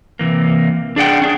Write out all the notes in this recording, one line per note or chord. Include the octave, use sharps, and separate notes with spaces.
C3 E3 A#3
D4 G#4 D5 F#5 G5
C#4 D4 G#4